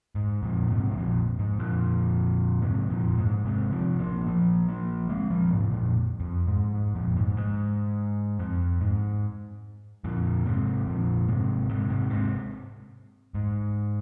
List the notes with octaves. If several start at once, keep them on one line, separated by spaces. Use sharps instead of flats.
G#2
F2 A#2
G#2 C3
C3
F2 A#2
G#2
F2 A#2
G#2 C3
F2 A#2
G#2
G#2 C3
C3 F3
F3 A#3
F3 A#3
F3 A#3
G#3 C4
F3 A#3
G#2 C3
F2 A#2
F2
G#2
G#2
F2 A#2
G#2
G#2
F2
G#2
F2 A#2
G#2 C3
F2 A#2
G#2 C3
G#2 C3
G#2 C3
G#2 C3
G#2